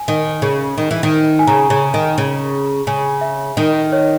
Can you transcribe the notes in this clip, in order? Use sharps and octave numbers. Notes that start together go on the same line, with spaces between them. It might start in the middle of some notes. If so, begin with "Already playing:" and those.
Already playing: G#5
D#3
C#3
D#3
E3
D#3
G#5
C#3 A#5
C#3
D#3
C#3
C#3 G#5
E5
D#3 D#5
C#5